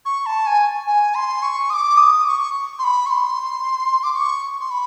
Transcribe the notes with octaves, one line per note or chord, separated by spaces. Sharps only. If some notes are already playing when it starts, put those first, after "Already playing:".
C#6
A5
G#5
G#5
C6
C#6
D#6
D6
D#6
D6
C#6
C6
B5
C#6
C6
D6
C#6
C6
B5